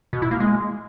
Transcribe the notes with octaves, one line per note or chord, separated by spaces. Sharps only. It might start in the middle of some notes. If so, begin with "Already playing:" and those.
B2
E4
A#3
G#3